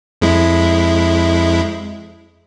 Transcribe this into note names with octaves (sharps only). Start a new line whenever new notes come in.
F2 G#3 E4